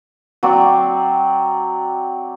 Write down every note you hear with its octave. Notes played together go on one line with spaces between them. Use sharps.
F#3 C4 D5